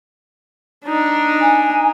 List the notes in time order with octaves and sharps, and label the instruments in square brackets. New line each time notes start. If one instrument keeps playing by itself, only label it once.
[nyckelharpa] D4 D#4
[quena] G#5